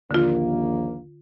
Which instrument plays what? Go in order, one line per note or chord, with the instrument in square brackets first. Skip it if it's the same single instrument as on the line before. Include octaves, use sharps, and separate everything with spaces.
[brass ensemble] A#1 D#2 A#3 [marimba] D3 F4